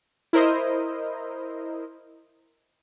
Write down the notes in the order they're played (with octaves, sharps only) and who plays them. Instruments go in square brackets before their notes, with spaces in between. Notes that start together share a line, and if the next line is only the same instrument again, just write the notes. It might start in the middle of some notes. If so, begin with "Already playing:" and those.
[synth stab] E4 A#4 C5 D#5